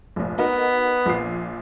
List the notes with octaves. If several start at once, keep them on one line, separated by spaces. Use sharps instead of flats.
F1 A#1
B3 D#4 F#4 A#4
A#1 A#2 C7